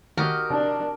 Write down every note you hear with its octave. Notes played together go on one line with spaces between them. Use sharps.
D#3 F#4 G4 A#4 D#5
C3 D4